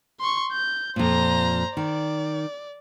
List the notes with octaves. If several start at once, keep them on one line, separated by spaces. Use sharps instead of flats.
C6 C#6
G6
F2 A#2 C5 A#5
D#3 D5